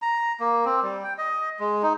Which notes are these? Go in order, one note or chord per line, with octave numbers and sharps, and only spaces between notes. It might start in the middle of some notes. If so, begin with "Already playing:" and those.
A#5
A#3
C4
G3
G5
D#5
G#3
D#4